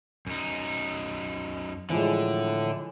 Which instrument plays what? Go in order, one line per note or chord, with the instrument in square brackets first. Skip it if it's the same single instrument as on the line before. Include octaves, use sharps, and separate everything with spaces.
[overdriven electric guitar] F#2 D#4
[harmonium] A2 [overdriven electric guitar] D3 [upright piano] E3 F3 G#3